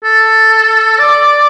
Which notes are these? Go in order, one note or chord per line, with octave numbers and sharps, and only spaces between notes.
A4
D5